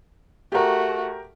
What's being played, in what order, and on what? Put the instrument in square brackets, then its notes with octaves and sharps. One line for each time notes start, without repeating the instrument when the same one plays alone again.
[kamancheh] A3 F#4 [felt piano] G4 A#4